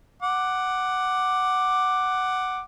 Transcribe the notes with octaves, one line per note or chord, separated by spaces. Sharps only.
F#5 D6